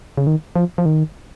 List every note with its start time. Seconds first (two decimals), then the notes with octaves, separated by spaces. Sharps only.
0.18 C#3
0.27 D#3
0.56 F3
0.78 F3
0.86 D#3